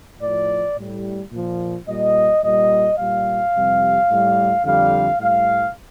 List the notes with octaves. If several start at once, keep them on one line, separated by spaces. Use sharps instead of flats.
A2 F3 D5
A2 G3
A#2 F3
A#2 G3 D#5
A#2 G3 D#5
A#2 G3 F5
F2 C3 G3
A2 G3
F2 D3 G3 F5
A2 G3 F5